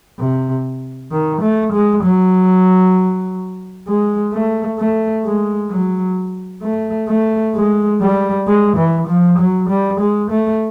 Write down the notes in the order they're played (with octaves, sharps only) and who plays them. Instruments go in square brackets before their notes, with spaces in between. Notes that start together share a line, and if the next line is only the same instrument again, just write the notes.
[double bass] C3
D#3
A3
G#3
F#3
G#3
A3
A3
G#3
F#3
A3
A3
G#3
G3
G#3
E3
F3
F#3
G3
G#3
A3